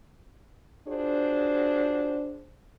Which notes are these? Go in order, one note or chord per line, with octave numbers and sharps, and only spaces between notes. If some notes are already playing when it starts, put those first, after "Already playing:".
D4 F4 F#4 G#4 C5